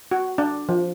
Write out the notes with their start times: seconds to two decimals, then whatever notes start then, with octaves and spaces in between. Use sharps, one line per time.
0.11 F#4
0.38 D4
0.69 F3